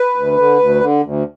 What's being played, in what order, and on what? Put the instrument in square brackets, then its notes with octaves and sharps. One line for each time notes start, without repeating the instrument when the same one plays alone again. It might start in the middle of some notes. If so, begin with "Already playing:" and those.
Already playing: [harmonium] B4
D2
D3
D2
D3
D2